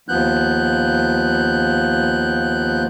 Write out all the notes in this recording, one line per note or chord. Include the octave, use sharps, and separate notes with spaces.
D#2 F3 B3 F#6 G6